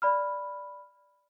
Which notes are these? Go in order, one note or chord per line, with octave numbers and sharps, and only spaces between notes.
D5 B5 F6